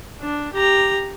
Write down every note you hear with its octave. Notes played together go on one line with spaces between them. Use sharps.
D4
G4 A#5